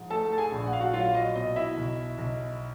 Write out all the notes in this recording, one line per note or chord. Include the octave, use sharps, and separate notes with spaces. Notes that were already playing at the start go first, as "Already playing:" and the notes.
Already playing: G#2 F3
A3 A4 A5
A5
G#4 G#5
A#1
F#5
F5
F#4 F#5
F#3 F4 F5
D#5
B2 D#5
E4 E5
B1
B1